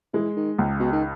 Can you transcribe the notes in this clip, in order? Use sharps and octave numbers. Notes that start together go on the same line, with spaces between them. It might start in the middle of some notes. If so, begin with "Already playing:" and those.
E3 G#3
D#3
C#2
B2
D#3